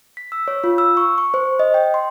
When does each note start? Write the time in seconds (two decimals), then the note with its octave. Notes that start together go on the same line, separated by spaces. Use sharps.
0.17 B6
0.32 E6
0.48 C#5
0.64 F4
0.78 E6
0.97 C#6
1.18 C#6
1.34 C5
1.59 D#5
1.74 G5
1.94 C6